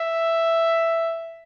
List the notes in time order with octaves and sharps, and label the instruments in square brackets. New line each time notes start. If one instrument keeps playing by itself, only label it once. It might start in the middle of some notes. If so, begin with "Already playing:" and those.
Already playing: [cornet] E5